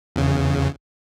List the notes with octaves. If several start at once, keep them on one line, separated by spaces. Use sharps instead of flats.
E2 C#3